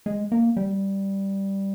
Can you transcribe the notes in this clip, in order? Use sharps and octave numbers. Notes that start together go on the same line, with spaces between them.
G#3
A#3
G3